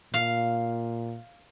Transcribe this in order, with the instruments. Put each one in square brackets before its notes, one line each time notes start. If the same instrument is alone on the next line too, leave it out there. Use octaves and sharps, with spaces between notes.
[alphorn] A#2 [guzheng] F5